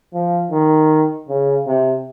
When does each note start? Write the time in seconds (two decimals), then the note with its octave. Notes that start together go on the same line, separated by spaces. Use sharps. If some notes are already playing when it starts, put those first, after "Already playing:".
0.14 F3
0.51 D#3
1.29 C#3
1.67 C3